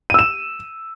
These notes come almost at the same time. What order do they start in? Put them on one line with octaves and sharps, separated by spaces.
D#7 E6 E7